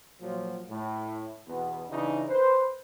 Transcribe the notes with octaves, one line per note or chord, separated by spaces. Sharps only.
A#2 F3 F#3
A2
E2 B2 B3
C#3 E3 D4 D#4
B4 C5